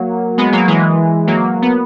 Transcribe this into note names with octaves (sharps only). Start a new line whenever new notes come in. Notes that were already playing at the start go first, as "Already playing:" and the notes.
Already playing: F#3 A#3
G#3 B3
F#3 A#3
E3 G#3
F#3 A#3
B3